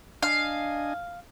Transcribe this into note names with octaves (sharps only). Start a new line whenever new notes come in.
D4 D#5 F5 G#5